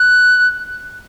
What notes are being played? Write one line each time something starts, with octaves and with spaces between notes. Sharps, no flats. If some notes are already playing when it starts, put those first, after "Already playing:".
Already playing: F#6